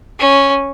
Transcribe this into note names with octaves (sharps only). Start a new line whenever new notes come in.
C#4